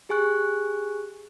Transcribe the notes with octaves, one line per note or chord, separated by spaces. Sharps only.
G4 G#4 G#5 C#6 F#6